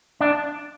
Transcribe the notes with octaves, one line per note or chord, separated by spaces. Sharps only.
D4